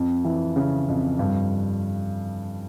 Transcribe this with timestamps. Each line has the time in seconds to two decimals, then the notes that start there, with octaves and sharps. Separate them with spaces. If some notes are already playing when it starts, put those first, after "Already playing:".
Already playing: F2
0.25 E3
0.56 C#3
0.88 F2
1.19 G2